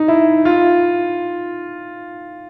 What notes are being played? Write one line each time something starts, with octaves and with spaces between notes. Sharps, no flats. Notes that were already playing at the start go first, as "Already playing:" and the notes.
Already playing: D#4
E4
F4